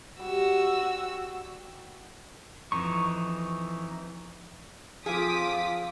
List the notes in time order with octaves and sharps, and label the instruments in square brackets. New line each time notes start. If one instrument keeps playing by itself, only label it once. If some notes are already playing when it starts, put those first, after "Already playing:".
[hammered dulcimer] G3 [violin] F#4 E6
[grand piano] F2 [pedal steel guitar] E3 D#4 C#6
[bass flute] F3 [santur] C4 F5 [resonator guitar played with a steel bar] G#4 [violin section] D6 D#6 B6